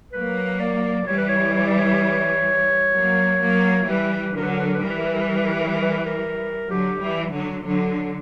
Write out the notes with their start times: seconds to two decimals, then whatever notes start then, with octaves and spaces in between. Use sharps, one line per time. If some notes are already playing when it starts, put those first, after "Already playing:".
0.12 F#3 A#3 B4
0.60 D5
1.06 E3 G3 C#5
1.18 B4
1.29 C#5
1.54 C#5
1.67 D5
1.79 C#5
2.95 F#3 A#3
3.41 F#3 A#3
3.88 E3 G3 B4
4.36 D3 F#3 A#4
4.43 B4
4.51 A#4
4.59 B4
4.67 A#4
4.74 B4
4.82 E3 G3 A#4
4.90 B4
4.97 A#4
5.05 B4
5.13 A#4
5.21 B4
5.29 A#4
5.36 B4
5.44 A#4
5.51 B4
5.60 A#4
5.67 B4
5.75 A#4
5.82 B4
5.90 A#4
5.98 B4
6.06 A#4
6.70 D3 F#3 G4
7.02 E3 G3
7.33 D3 F#3
7.65 D3 F#3